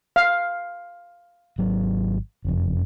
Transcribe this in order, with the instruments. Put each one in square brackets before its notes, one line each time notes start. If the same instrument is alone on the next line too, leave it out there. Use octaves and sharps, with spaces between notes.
[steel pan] F5
[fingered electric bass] G#1 F#3
F#1 F2